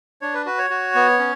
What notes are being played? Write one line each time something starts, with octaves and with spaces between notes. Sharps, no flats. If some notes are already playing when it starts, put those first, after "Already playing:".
D4 C#5
B4
F#4 B4
C#5
F#4
B3
C#4